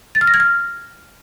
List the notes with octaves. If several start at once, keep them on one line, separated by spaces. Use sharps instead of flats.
A6
F6
A#6
G#6
F6